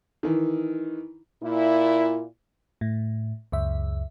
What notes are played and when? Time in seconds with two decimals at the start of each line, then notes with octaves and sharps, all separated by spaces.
0.23 D#3 E3
1.43 A#2 E4
2.81 A2
3.52 C#2 F#2 E5